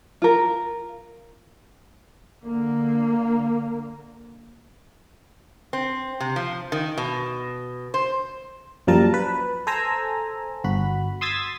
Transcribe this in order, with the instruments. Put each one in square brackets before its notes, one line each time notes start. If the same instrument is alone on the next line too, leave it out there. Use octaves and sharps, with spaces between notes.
[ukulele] F4 A#4
[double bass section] D3 A#3
[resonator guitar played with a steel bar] C4
C3
F3
D#3
B2
C5
[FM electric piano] F#2 A#2 F3 G3 A#4 A5
B4
A4 C5 G#5 A#5 E6
G1 F#4 B5
C6 D#6 E6 G#6 A6 B6